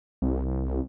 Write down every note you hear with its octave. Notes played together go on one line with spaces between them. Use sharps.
C2